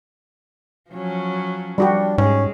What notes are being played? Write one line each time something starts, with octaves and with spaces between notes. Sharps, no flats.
F3 F#3 C#4
F3 G3 D4 F#4 G4
G#2 G#3 C#4